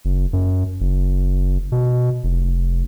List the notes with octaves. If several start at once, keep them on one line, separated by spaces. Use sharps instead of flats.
F#1
F#2
F#1
B2
F1
F1